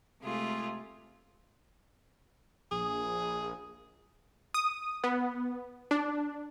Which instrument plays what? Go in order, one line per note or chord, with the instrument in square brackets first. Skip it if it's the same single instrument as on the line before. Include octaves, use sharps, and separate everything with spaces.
[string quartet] C3 G#3 A3 F4 G#4
[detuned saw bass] A#1 [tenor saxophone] G#4
[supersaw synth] D#6
B3
D4